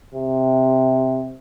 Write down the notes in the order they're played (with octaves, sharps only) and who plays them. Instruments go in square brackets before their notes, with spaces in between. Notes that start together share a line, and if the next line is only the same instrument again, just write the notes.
[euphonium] C3